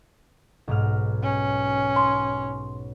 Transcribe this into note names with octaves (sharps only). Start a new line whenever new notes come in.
B1 G#2 F6
C#4
C6